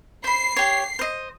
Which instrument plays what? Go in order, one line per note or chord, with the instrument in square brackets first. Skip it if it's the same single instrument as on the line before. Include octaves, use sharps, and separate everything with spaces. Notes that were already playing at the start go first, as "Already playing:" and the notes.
[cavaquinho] C5 B5 [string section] C7
[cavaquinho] G4 C#5
C5 D#5